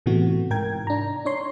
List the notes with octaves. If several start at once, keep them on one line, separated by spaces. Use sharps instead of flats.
A2 C3 E3 A3 B3 F#4
G#2 A#4 G5 G#6
D4 A#5
D4 C#5 C6